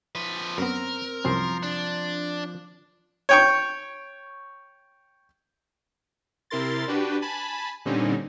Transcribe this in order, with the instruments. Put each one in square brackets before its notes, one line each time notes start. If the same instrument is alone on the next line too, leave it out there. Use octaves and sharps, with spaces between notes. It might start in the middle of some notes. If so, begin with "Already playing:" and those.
[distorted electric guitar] F3 B4
[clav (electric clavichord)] F#2 B3 [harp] C4 [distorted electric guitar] A#4
[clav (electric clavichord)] C2 F#2 C4 [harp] F3 C6
[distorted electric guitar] D4
[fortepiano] C#5 G5 C#6
[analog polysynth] C3 E4 A#4 C6 A6
D4 F#4 G4 B4
G#5 A5 B5
A#2 D3 G3 C4 C#4 D#4